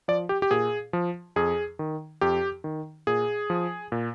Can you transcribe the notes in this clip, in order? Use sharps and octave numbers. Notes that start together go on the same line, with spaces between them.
F3 D5
G4
G4
A#2 G#4
F3
F2 G#4
D#3
F2 G4
D#3
A#2 G#4
F3
A#2